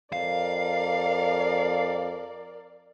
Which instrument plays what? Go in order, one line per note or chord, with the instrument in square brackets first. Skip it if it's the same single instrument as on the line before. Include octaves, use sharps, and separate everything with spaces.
[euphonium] F2 [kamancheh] A#4 D5 [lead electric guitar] F5